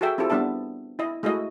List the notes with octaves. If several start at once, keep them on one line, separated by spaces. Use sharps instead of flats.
F#4 G#4 A4 E5 G5
C4 E4 F4 G4 A4
G3 B3 D4 E5 A5
E4 D#5
G#3 A3 E4 F#4 D#5